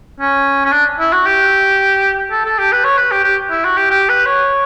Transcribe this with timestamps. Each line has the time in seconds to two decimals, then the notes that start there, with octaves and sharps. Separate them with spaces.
0.20 C#4
0.65 C#4
0.72 D4
0.99 E4
1.13 F#4
1.26 G4
2.31 A4
2.45 A4
2.58 G4
2.72 B4
2.84 C#5
2.97 B4
3.11 G4
3.24 G4
3.50 E4
3.65 F#4
3.77 G4
3.90 G4
4.09 B4
4.26 C#5